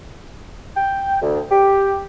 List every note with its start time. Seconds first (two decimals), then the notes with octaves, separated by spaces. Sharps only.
0.76 G5
1.21 D2
1.51 G4